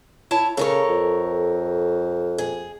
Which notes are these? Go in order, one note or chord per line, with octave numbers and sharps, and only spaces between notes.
E4 C#5 A5
C#3 A4 A#4 C#5
F2
G#4